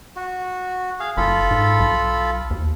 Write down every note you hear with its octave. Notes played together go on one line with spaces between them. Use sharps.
F#4
G#4 F5
F#1 F4 A4 B5
G#2
B1
D#2